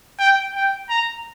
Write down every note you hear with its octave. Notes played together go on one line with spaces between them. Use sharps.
G5
G5
A#5